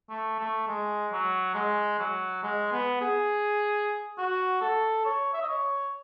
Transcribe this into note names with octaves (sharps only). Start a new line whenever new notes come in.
A3
A3
G#3
F#3
G#3
F#3
G#3
B3
G#4
F#4
A4
C#5
E5
D#5
C#5